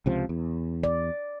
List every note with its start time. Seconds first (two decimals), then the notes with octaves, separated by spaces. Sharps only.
0.06 C#2 C3 F3
0.29 E2
0.84 D5